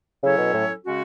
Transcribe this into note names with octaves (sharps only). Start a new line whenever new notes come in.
C#3 F#3 C#4 E4 A4 C#5
B2
A2
C#3 G#3 C#4 F#4